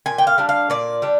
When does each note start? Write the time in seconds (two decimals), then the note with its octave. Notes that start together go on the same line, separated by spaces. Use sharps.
0.06 A#2 G#5
0.18 G5
0.27 F5
0.38 G3 D4
0.49 F5
0.70 A#2 D5
1.02 G3 D4